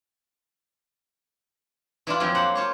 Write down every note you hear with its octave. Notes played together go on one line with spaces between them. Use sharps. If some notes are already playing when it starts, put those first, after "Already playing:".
E3 D4 E4 F4
F2 F3 F#3 G5
A#3 C5 F#5
F4 C5 C#5